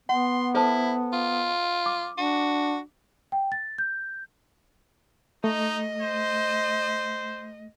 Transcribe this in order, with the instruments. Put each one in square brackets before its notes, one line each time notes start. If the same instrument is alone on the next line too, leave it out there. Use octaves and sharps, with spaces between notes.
[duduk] B3 [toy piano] F#5 [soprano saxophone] C6
[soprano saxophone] E4 [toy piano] A4 C5 A5
[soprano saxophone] F4
[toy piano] D6
[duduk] D4 [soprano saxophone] F#4
[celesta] G5
A6
G6
[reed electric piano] A3 [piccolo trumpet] D#4 [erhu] D#5
[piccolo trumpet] C5